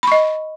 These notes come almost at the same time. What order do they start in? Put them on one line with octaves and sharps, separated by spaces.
B5 C#6 D#5